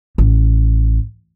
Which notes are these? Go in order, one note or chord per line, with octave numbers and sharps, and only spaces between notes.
A1